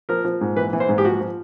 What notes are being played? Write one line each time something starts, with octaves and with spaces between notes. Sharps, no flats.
F3 A#4
F3
G#2
E3 B4
E3
C5
G#2
G4
F3 F#4
F3